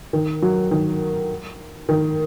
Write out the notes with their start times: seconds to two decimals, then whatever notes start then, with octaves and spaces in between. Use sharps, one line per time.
0.13 D#3
0.42 F#3
0.71 D#3
1.89 D#3